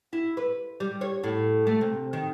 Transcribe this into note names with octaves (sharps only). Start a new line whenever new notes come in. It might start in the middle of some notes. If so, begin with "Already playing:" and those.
E4
B4
G3
C#5
A2
A3
C3
D#3